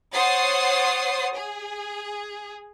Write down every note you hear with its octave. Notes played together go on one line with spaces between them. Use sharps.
C5 C#5 F#5 D#6 A6 C7
G#4